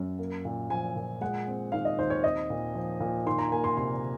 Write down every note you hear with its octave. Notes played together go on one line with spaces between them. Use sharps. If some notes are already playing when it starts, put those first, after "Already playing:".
Already playing: F#2
A#3
A#2
F3 G#5
A#2
G#3 F#5
C4
D#3 F5
D#5
D#2 C5
C#5
C4 D#5
A#2
F3
A#2
D#3 C6
A#5
A#3 G#5
C6
C3 C6